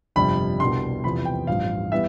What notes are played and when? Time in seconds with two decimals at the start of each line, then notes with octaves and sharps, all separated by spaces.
0.16 G1 F2 C3 G3 D4 B5
0.60 C2 B2 G3 D4 C6
1.04 E2 C3 F3 B3 B5
1.25 G5
1.47 A1 G2 F3 F5
1.92 E3 G3 B3 E5